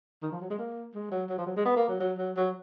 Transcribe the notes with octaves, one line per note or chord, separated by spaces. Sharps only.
D#3
F3
F#3
G#3
A#3
G#3
F#3
F#3
F3
F#3
G#3
B3
A#3
F#3
F#3
F#3
F#3